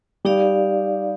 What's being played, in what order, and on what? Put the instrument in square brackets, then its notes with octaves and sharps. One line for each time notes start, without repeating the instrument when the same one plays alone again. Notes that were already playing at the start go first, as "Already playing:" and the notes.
[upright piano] G3 [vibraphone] D#4 G4 D5 F5